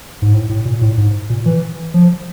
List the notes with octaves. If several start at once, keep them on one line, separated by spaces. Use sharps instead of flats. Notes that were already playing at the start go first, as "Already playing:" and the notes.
G#2
A2
A2
A#2
A2
G#2
A#2
E3
F3